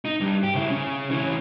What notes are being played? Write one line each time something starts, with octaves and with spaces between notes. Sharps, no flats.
D#4
G2
G4
C#3 E4
C#3
E3 C#4